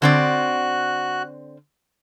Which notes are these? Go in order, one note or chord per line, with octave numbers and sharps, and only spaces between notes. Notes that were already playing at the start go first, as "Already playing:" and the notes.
D3 C4 F#4 D5 F#6